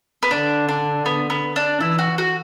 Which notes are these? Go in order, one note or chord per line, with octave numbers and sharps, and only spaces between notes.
B3
D3 D4
D4
B3
B3
D4
E3 E4
F#4
F#4